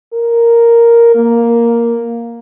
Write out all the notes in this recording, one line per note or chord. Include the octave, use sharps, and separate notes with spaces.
A#4
A#3